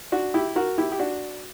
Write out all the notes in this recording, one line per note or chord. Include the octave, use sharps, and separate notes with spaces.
D4 F#4
E4 G4
F#4 A#4
E4 G4
G4
D4 F#4